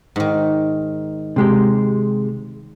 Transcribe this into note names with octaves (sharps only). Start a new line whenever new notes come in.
G#2 D#3
C3 G#3 G4